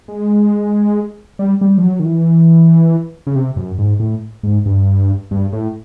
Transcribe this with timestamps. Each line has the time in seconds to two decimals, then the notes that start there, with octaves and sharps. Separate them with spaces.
0.08 G#3
1.39 G3
1.61 G3
1.78 F3
1.83 F#3
2.00 D#3
2.05 E3
3.27 C#3
3.36 C3
3.56 F#2
3.79 G#2
4.00 A2
4.43 G#2
4.66 G2
5.31 G2
5.53 A2